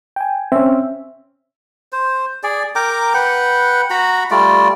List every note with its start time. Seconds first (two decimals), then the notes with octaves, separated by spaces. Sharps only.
0.16 G5 G#5
0.52 C4 C#4 E5
1.92 C5
2.43 G#4 D5
2.75 A#4 G5 A#5 D6
3.14 B4 F#5 G5
3.90 F#4 A#5 B5
4.31 G3 A3 F4 D5